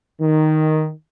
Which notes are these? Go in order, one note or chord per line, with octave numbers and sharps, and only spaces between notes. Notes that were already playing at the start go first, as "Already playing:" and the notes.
D#3